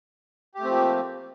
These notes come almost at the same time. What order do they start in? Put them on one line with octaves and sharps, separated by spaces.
G4 A3 C4 F3 A#3